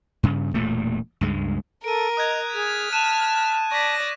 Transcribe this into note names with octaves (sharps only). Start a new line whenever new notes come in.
G2 C#3
E1 G2 A#2 A3
C#2 G2 G#3
A4 A#4 D7 D#7
D#5 D#6 F#6 G#6
G#4 F6 B6
A5 F#6 D#7 E7
D5 C#6 A#6 B6